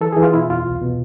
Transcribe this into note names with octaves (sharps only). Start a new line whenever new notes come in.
E3 A4
G#4
E3
F4
B2 E4
E2 F4
C2
B2